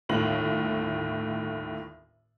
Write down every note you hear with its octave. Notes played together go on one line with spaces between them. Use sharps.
G1 D#2 A2 F#7